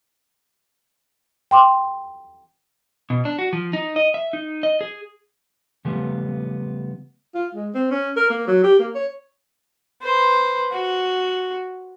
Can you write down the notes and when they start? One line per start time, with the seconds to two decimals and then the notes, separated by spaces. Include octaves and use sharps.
1.51 G5 C6 D6
3.10 B2
3.25 D4
3.39 F#4
3.53 F3
3.73 D#4
3.96 D#5
4.14 E5
4.33 D#4
4.63 D#5
4.81 G#4
5.85 C#3 F3 G3 A3 B3
7.35 F4
7.55 G#3
7.75 C4
7.91 C#4
8.17 A#4
8.30 A#3
8.48 F#3
8.64 G4
8.80 A#3
8.95 C#5
10.02 B4 C5
10.72 F#4